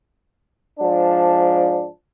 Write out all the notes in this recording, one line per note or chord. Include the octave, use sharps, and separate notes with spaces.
G#2 F3 D4